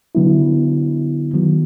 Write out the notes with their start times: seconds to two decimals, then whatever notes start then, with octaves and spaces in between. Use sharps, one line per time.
0.15 D3 F#3 B3 E4
1.34 D#3 F#3 B3